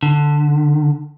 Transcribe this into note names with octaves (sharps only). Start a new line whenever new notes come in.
D3